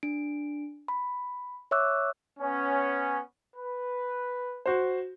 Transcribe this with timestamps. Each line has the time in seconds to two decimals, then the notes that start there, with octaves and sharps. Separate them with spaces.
0.03 D4 D7
0.88 B5
1.71 C#5 E5 C#6 D6 E6 F#6
2.39 B3 C#4
3.55 B4
4.66 F#4 C5